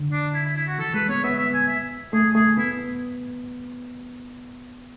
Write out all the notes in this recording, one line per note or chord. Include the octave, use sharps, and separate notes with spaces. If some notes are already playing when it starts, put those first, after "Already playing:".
Already playing: D3
D4
E4
E4
E4
F#4
E3 A4
G#3 B4
B3 C#5
B3 E5
E5
G#5
E5
A3 G#4
A3 G#4
B3 E4